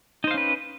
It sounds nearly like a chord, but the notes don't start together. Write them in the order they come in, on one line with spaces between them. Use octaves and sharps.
D#4 C5 F5 C#4 B4